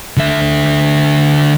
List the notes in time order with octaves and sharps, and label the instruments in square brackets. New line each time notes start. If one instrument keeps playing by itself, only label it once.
[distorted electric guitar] D3 E5